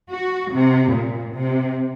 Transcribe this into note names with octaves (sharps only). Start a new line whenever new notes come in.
F#4
C3
A#2
C3